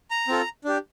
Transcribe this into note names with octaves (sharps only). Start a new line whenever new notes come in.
A#5
C4 F4 A4
D4 G4